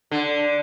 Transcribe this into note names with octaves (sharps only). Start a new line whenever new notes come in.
D3